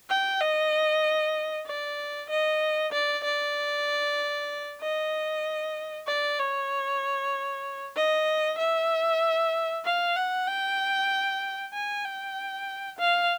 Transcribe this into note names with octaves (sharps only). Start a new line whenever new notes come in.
G5
D#5
D5
D#5
D5
D5
D#5
D5
C#5
D#5
E5
F5
F#5
G5
G#5
G5
F5